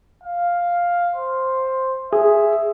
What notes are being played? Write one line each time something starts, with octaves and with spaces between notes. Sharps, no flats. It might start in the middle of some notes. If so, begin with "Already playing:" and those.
F5
C5
G#4 E5